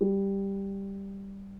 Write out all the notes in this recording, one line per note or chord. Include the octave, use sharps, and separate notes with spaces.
G3